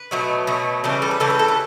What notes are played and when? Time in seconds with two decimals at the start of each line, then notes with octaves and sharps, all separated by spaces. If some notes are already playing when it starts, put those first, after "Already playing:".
Already playing: B4
0.11 B2 F#3 A3
0.47 B2 F#3 A3
0.84 C#3 E3 G3 A4
1.02 A4
1.11 B4
1.20 C#3 E3 G3 A4
1.30 B4
1.39 A4
1.48 B4